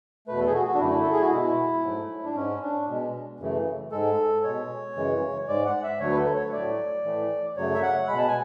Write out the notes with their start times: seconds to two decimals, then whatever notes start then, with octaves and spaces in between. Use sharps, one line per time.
0.27 E2 B2 A3 B4
0.40 A4
0.47 G#4
0.54 F#4
0.67 F#4
0.75 D4
0.79 F#2 D3 A3 E4
1.03 A4
1.12 G#4
1.21 F#4
1.32 B2 G#3 E4
1.84 G#2 F#3 A3
2.25 D4
2.36 G#2 G#3 C#4
2.62 D4
2.88 B2 G#3
3.39 F#2 C#3 E3 A3
3.92 G#2 G#3 A4
4.44 B2 G#3 C#5
4.96 F#2 C#3 E3 G#3
5.48 G#2 G#3 D5
5.66 F#5
5.83 E5
6.00 D2 D3 F#3 A3 C#5
6.11 B4
6.17 A4
6.36 C#5
6.52 A2 F#3 A3 D5
7.04 A2 E3 A3
7.57 F#2 C#3 F#3 A3 C#5
7.75 E5
7.83 F#5
8.08 B2 G#3 B5
8.18 A5
8.28 G#5